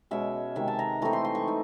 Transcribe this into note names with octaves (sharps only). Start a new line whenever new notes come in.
B2 G#3 C#4 E5
C3 D#3 G#3 E5
A5
A#5
E3 A3 C4 D#4 A#5
C6
C6
C#6
C4 D#4